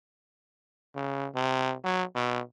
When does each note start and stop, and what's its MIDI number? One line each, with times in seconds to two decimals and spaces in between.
0.95 1.28 49
1.35 1.74 48
1.85 2.03 54
2.15 2.41 47